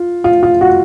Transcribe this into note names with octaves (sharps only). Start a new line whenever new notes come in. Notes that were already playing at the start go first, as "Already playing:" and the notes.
Already playing: F4
F4
F4
F#4